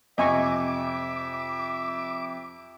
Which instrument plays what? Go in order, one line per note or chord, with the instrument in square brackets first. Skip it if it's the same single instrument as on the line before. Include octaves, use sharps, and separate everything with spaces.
[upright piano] F2 C3 [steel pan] D#5 G#5 C#6 [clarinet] E5 [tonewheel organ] D6